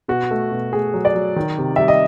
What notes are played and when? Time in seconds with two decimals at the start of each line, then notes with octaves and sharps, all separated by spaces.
0.08 B2 F#4
0.31 A3
0.51 B2
0.73 A3 G#4
0.94 F#3
1.05 D5
1.15 F#3
1.36 D#3
1.58 C3
1.76 G3 E5
1.88 D#5